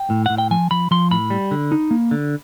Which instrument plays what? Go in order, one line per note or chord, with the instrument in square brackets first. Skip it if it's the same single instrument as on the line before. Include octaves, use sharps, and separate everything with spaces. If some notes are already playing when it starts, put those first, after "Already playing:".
Already playing: [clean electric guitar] G5
A2
A2 F#5
G5
F3 G#5
F3 B5
F3 C6
A2 B5
G3
D3
D#4
A#3
D3